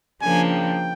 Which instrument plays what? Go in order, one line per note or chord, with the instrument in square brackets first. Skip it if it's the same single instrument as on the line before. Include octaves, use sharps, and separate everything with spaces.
[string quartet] C#3 F3 A#3 D4 [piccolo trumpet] G#5
[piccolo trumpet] G5